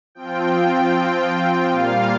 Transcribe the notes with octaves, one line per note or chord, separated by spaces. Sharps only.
F3 C4 F4 G5
A#2 G3 A#3 F4 F5